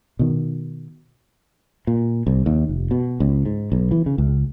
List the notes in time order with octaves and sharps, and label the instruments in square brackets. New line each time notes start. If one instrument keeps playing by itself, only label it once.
[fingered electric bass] B2 D#3
[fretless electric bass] A#2
C2
D#2
F1
B2
C#2
G#2
B1
E3
C#3
C#2